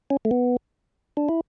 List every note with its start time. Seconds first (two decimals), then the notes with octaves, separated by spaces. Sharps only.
0.10 C#4
0.25 A3
0.31 B3
1.17 D4
1.29 E4